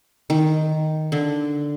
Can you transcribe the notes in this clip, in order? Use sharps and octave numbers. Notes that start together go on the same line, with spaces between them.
D#3
D3